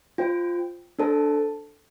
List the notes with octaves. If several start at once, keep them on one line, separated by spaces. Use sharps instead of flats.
F4 C5 G5
D4 A4 C5 A5